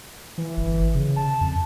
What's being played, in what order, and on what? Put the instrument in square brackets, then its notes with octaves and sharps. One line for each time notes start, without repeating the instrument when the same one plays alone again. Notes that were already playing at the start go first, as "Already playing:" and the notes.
[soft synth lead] E3
[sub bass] G1
C#3
[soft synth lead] A5
[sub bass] F2